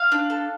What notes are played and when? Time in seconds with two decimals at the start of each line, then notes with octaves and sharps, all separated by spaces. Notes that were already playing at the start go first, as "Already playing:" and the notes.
Already playing: F5
0.12 D4
0.30 A4